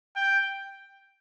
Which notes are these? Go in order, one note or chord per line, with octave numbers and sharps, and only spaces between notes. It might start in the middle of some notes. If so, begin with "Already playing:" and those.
G5